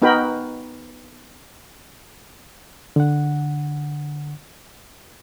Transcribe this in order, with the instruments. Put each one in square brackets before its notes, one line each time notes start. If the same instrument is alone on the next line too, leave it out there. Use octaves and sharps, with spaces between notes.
[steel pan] B3 D#4 F#4 A#4 G5 B5
[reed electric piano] D3 F#5